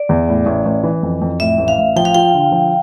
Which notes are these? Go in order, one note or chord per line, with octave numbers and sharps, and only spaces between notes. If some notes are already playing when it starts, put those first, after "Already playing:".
Already playing: D5
E2
A2
A1
A1
E3
F2
F2
A2 E5
A1
F5
A1
F3 G5
F5
F4 G5
D3
F3